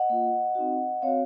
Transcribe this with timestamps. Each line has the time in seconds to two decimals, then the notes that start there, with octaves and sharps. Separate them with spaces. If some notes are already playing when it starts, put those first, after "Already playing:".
Already playing: D#5 F#5
0.09 A#3 F4
0.55 C4 D#4 F#4
1.02 C4 F#4 C#5 F5